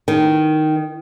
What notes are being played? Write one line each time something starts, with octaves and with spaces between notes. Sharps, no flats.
D#3